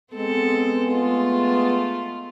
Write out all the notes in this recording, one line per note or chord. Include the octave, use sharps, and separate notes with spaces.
G#3 B3 C4 A4
A3 F4